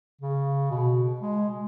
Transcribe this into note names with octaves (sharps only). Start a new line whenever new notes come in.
C#3
B2
G#3